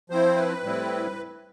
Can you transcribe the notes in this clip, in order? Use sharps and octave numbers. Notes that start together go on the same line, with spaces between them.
F3 C4 E4 C5
B4
A2 G3 C4 E4